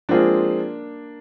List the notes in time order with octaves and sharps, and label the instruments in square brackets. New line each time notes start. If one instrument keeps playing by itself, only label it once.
[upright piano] F3 G#3 C4 F4 G#4 [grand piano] A#3 D4